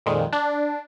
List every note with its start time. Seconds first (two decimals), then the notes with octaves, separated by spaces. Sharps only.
0.06 F2 A#2 D#3 G#3
0.33 D4